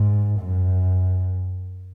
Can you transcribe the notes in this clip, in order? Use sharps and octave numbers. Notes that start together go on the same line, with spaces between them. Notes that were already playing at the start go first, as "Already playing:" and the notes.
Already playing: G#2
F#2